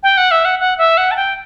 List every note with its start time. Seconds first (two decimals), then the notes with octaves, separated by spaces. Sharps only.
0.03 G5
0.17 F#5
0.31 E5
0.45 F#5
0.59 F#5
0.78 E5
0.97 F#5
1.11 A5
1.16 G5